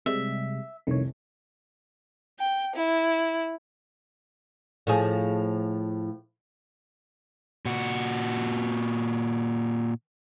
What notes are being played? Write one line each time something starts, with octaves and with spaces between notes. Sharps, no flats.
C3 G3 G#3 E5
F1 C2 D#3 C#5
G5
E4
A2 F3 G#4
A#2 F#4